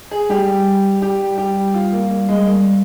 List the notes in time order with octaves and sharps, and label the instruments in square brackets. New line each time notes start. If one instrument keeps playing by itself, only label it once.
[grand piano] G#4
[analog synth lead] G3 [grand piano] G4
[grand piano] G4
G4
F4
A#3
A#3
G#3
A#3